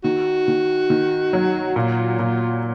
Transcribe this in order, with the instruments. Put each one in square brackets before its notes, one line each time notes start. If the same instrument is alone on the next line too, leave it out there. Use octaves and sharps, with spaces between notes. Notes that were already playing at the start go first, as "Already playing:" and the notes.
[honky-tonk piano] D#3 [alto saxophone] F#4
[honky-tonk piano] D#3
D#3
F#3
[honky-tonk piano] A#2 [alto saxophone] F4
[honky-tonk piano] A#2